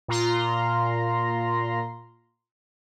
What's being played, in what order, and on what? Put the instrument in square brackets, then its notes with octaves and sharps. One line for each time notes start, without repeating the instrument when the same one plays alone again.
[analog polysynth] A#2 F4 A#5 C6